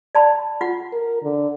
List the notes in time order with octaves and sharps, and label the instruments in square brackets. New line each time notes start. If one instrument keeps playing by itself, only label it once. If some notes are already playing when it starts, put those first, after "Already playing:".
[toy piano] D5 A5 B5
F4 F#5
[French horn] A#4
D3